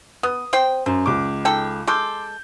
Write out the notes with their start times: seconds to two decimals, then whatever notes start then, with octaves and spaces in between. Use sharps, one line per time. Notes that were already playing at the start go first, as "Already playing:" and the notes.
0.23 B3 D#6
0.53 C4 C5 G5
0.86 F#2 C5
1.06 C#2 D6
1.45 D#4 A4 G5
1.87 G#3 A4 C6 D6 G6